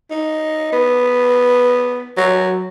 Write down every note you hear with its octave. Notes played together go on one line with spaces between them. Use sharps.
D#4
B3
F#3